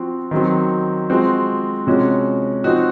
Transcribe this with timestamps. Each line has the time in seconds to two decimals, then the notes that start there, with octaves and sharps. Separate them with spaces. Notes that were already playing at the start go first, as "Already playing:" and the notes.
Already playing: F3 C4 F#4
0.31 D#3 F#3 C4
1.10 F3 G#3 C4 F#4
1.87 C3 F3 G#3 C#4 F#4
2.64 F3 C4 D#4 F#4